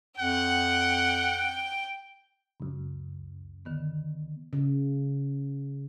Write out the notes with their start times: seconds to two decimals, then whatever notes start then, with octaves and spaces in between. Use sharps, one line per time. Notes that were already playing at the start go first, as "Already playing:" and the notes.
0.19 F2 F#5 G5
2.60 C#2 F#2
3.65 D3 D#3 B3
4.53 C#3